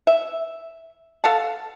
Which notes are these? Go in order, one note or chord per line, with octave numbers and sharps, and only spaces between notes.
E5
A4 F5 F#5 A5